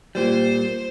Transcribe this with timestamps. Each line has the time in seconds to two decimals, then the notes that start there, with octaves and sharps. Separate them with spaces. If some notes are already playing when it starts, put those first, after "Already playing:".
0.15 A#2 G3 C5